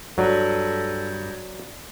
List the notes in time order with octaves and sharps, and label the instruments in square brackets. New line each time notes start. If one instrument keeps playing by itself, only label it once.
[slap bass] G2 [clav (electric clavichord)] F#3 [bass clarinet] A4 [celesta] D5